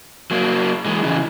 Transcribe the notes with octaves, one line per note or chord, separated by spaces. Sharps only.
F#3 A#3
E3 G#3
C#3 E3